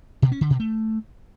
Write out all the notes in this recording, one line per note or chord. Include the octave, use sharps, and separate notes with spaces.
B2
C#4
D3
B2
A3